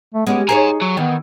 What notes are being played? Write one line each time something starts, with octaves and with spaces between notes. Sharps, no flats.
A3
G#3 B3 C#4 G4
D#4 G#4 B4 C#5 G#5 A#5
F#3
D#3 E3 B3